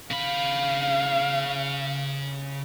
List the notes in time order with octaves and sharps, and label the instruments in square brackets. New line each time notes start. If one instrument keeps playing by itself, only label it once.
[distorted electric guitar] C#3 B5 [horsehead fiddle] F5